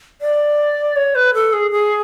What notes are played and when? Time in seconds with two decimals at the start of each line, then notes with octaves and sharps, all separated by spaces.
0.21 D5
0.96 C#5
1.15 B4
1.34 A4
1.53 G#4
1.71 G#4